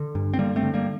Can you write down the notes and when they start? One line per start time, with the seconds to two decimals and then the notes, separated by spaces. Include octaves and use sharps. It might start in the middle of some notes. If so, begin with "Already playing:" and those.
Already playing: D3
0.15 G2
0.34 C4
0.39 D3 G3 A#3
0.56 A3 C4
0.63 D3
0.74 G3 A#3